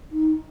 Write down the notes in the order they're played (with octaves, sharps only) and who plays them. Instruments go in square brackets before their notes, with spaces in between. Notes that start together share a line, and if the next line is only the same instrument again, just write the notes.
[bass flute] D#4